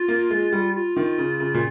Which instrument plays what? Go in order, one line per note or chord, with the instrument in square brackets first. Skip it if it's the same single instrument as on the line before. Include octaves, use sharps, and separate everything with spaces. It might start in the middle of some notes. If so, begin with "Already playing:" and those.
Already playing: [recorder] F4
[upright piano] A#3
G#3
G3
[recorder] F4
[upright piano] D#3
C#3
C#3
A#2